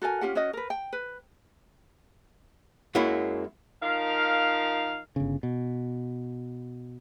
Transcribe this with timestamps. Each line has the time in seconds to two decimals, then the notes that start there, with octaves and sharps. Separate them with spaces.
0.02 F#4 A4 A#4 G#5
0.21 C#4 F4 G4 F#5
0.35 C#4 F#4 C#5 D#5
0.53 A#4 B4
0.70 G5
0.93 B4
2.95 F#2 F#3 G#3 A#3 E4
3.81 F3 D#4 A#4 F5
5.16 G1 C#3
5.43 B2